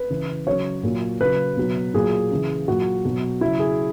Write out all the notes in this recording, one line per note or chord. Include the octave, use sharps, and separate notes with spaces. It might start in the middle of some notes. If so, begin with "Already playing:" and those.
Already playing: B4
C#3 E3
C#3 F#3 C#5
A#2 F#3
C#3 F#3 B4
B2 F#3
A#2 F#3 G#4
C#3 E3
A#2 F#3 F#4
B2 F#3
C#3 F#3 E4
G#4